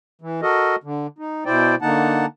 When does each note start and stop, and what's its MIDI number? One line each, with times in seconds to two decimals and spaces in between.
0.21 0.41 52
0.42 0.76 66
0.42 0.76 69
0.42 0.76 70
0.42 0.76 75
0.84 1.07 50
1.18 1.44 63
1.46 1.75 47
1.46 1.75 64
1.46 1.75 72
1.46 1.75 74
1.46 1.75 79
1.82 2.26 50
1.82 2.26 58
1.82 2.26 63
1.82 2.26 78
1.82 2.26 81